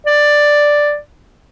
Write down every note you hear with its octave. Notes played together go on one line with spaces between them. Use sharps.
D5